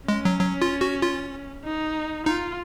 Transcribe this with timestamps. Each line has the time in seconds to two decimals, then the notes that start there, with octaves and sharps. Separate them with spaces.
0.08 G#3 C#4
0.25 F#3
0.40 F#3
0.62 F4
0.81 F#4
1.02 F4
1.64 D#4
2.26 D#4 F4